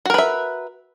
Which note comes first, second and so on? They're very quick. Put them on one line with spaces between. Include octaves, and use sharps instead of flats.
F#4 A#4 B4 E5